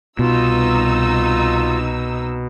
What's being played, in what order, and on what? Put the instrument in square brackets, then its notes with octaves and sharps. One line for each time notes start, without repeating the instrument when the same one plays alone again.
[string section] C2 D#4 E6 [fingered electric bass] B2 [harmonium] F4